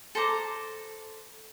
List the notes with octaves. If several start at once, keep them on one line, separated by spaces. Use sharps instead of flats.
A4 C5 A#5 D6